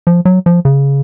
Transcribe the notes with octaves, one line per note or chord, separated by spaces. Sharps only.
F3
F#3
F3
C#3